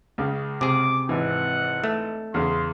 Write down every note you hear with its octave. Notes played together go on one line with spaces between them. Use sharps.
C#2 C#3
C3 G#4 D6
G#1 E3 F#5
A3
E2 C#3 C6